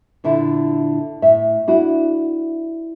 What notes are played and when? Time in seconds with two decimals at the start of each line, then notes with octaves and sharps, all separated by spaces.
0.24 A#2 D3 E4
1.22 A2 E5
1.67 D4 E4 F#4